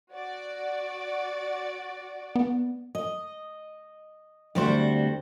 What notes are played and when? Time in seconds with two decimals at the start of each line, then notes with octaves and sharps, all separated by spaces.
0.14 F#4 D5
2.36 B3
2.95 D#5
4.55 D2 G3 C4 F#4 C5